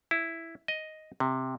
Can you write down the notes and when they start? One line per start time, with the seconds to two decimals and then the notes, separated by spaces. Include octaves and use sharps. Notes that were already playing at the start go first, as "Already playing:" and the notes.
0.11 E4
0.68 D#5
1.20 C3